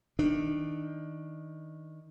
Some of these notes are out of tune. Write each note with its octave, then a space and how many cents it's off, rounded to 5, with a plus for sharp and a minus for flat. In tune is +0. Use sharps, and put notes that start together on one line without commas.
D#3 +20 D4 +25